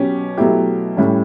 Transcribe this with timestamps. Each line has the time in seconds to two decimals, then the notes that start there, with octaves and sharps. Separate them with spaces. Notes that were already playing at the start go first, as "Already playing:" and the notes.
Already playing: B2 F#3 C#4 G4
0.38 B2 F#3 A3 E4 G4
0.97 A2 G3 C#4